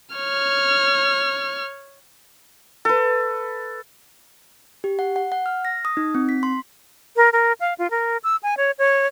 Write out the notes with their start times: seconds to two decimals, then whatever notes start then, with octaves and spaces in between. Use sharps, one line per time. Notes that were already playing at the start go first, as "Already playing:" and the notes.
0.15 C#5 F6
2.85 A4 B4
4.84 G4
4.99 F#5
5.16 F#5
5.32 F#5
5.46 F6
5.65 A#6
5.85 D#6
5.97 D#4
6.15 C4
6.29 B6
6.43 C6
7.16 A#4
7.33 A#4
7.60 F5
7.78 F4
7.91 A#4
8.24 E6
8.43 G#5
8.57 C#5
8.78 C#5